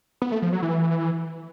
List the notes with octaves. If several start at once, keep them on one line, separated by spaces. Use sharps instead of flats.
B3
A3
F3
F#3
E3